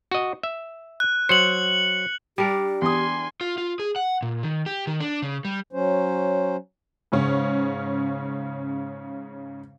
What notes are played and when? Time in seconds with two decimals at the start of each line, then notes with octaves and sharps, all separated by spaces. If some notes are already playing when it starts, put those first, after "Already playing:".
0.11 F#4 D#5
0.43 E5
1.00 F#6
1.29 F#3 C5 C#7 F#7
2.38 G3 D4 G4 A#4
2.82 E2 G#5 C6 D#6
3.41 F4
3.58 F4
3.79 G#4
3.96 F#5
4.22 A#2
4.43 D#3
4.66 G4
4.87 D#3
5.00 D4
5.22 C#3
5.45 G3
5.73 F#3 C#4 C5
7.12 G#2 C#3 C#4